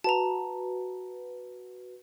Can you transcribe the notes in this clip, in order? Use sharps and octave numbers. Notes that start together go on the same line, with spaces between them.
F#4 B4 A5 A#5